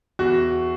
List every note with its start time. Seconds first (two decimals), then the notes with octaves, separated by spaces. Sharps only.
0.19 E2 F#4